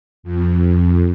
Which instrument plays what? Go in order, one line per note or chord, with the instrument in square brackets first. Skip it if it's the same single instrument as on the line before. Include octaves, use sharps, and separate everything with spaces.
[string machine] F2